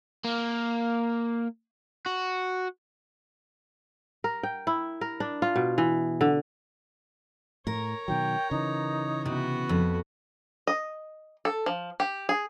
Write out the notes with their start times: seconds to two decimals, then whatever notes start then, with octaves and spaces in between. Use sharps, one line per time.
0.25 A#3
2.06 F#4
4.24 A#4
4.43 G5
4.67 E4
5.01 A#4
5.20 D4
5.42 F4
5.56 B2
5.78 E3
6.21 D3
7.67 A2 A#4 C#5 A#5
8.08 B2 D#3 F#3 G5
8.51 C#3 E3 D#4
9.26 C3 B3 F#4
9.69 F2
10.67 D#5
11.45 A4
11.66 F3
12.00 G4
12.29 G#4